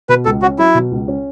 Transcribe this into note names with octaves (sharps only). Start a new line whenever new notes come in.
B2 B4
C#2 A4
C#4 F#4
F#3 E4
B2
C#2
C#4